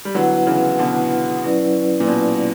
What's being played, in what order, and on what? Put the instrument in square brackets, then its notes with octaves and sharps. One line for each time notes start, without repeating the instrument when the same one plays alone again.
[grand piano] G3
[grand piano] D3 F#3 [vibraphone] B3 E4 B4 F#5
[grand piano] C#3 E3
B2 D3
[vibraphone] F#3 C#4 E4 B4 D5
[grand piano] A#2
B2